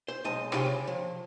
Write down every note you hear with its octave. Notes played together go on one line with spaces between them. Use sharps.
C5
B1 G#3 D#5 A5
C3 F4 G#4 C5 C#5 G5
C#3
F3